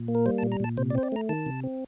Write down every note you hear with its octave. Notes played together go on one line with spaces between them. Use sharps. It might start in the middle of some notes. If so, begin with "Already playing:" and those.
Already playing: A#2
A#3
A#4
G3 C5
A5
A#2
A#5
A#2 A5
C3 C5
D5
C4 C5
D5
A3 A#5
D#3 A5
C3
C4